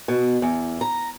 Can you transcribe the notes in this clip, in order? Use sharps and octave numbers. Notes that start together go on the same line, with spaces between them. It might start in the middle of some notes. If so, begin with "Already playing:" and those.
B2
E2
A#5